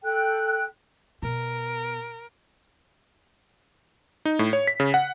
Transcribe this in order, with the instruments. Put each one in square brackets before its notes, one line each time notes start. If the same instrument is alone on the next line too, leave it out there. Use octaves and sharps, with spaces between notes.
[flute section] A4 G5 F#6
[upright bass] B2 [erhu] A#4
[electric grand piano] D#4
A2
C#5
B6
C#3
F#5